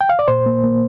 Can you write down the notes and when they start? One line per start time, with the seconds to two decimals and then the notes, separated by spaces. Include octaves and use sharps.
0.01 G5
0.09 F5
0.19 D5
0.28 A#2 C5
0.46 A#3
0.64 A#3